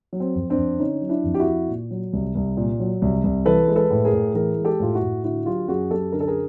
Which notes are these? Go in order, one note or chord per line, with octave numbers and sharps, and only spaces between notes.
F#3
C4
F2
C4 D4
F2
D3 C#4 D#4
F#3
D4 E4
F2
G4
E4 F#4
F2
A#2
F#3
C2
C2
A#2
F#3
C2
C2
E3 A4 B4
G#3
A4 B4
A2
G#4 A#4
A2
E3 G#4 A#4
G#3
G4 A4
A2 F4
E4 F#4
A2
D3 E4 F#4
F#3 F4 G4
F#2 F#4 G#4
F#2 G4 A4
D3 A#4
A4
G#4 A#4